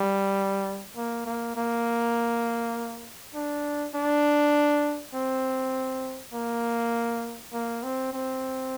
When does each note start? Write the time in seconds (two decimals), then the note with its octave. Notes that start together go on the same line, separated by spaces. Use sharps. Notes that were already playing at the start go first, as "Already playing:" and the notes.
Already playing: G3
0.96 A#3
1.26 A#3
1.55 A#3
3.34 D4
3.95 D4
5.14 C4
6.34 A#3
7.53 A#3
7.83 C4
8.13 C4